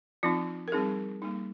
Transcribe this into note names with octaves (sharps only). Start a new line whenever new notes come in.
F3 C4 D#4 F4
A#4
G3 C4 D#4 G#4
G3 A#3 D#4